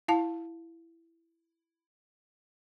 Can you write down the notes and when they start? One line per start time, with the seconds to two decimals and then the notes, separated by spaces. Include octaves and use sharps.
0.08 E4 F5 A5